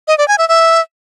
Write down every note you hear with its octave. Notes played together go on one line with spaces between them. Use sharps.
D#5
D5
G#5
E5
E5